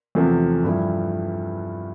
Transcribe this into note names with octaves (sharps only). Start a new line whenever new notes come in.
E2 C3 F3 A3
G2 F3 A3 E4